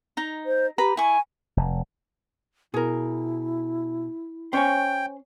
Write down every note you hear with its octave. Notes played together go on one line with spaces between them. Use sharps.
D#4 A#5
C5
G4 B4 A#5 B5
E4 G#5 C#6
F1
B2 E4 G#4 A#4
C#4 C5 C#5 G5 G#5